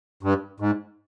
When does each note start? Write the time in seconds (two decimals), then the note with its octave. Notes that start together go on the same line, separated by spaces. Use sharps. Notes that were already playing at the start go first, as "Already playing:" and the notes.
0.23 G2
0.60 G#2